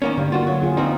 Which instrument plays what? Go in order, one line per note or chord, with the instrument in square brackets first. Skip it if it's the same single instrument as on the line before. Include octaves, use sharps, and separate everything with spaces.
[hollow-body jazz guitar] D#3 A#3 C#4
[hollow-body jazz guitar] G2 [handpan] D3 A#3
[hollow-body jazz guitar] F4 F#4
F#3
[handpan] F4 G#4
[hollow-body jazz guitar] F3 C4 D#4